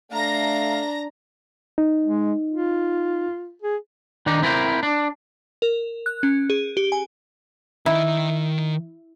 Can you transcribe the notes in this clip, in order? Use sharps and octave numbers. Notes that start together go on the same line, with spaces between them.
A3 D4 F5 A#5 A#6
D#4
G#3
F4
G#4
D#3 D4 D#4
C4 E4 A4 A#4 C5
D4
A#4
F#6
C#4
G#4
G4
G#5
D#3 E4 D#5